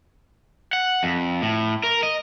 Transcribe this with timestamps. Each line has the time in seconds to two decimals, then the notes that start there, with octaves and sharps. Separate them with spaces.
0.73 F#5
1.03 F2
1.42 A2
1.84 A#4
2.03 D#5